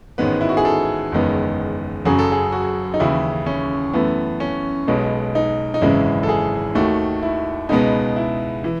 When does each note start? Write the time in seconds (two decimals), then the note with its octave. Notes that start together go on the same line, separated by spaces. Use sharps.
0.18 A1 G#2 D#3 G#3 B3 B4
0.41 E4
0.49 F#4
0.57 G#4
0.65 A4
1.12 F#1 E2 D#3 G#3 B3
2.05 F#1 F#2 C#3 F#3 G#4
2.19 A4
2.32 G#4
2.52 F#4
2.94 D#4
3.00 D#2 C#3 E3 E4
3.46 C#4
3.93 F#2 E3 A3 B3
4.40 C#4
4.87 B1 B2 G#3 B3
5.35 D#4
5.74 D#4
5.81 G#1 F#2 C#3 E3 G#3 E4
6.23 A4
6.29 G#4
6.75 D#2 D#3 A3 F#4
7.23 E4
7.69 C#2 B2 G#3 B3 D#4
8.16 E4
8.64 E3